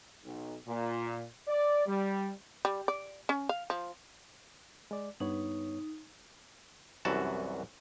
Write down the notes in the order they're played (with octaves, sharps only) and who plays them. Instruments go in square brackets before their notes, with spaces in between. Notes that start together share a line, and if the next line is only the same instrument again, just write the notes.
[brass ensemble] B1
A#2
D5
G3
[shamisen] G3
D5
C#4
F5
F3
[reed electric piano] G#3 D5
[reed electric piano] G2 B3 C#5 [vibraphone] D#4
[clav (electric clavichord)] C2 F#2 E3 F#4 A5